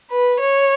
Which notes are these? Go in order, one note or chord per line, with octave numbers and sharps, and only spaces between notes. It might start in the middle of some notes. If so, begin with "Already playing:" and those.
B4
C#5